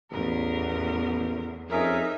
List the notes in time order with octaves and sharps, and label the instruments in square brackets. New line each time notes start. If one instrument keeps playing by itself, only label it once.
[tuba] A1 [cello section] E2 [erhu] A#4
[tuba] F2 [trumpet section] C#4 G#4 A#4 [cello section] D#4 [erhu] E5